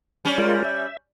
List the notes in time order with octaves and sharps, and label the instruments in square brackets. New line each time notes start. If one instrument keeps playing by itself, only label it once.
[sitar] G3 C#4
[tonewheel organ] G#3 F4 A#4
E5